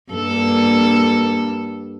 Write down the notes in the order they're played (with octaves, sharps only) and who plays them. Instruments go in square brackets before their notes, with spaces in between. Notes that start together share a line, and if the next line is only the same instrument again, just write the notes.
[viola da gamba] G2 A#3 A4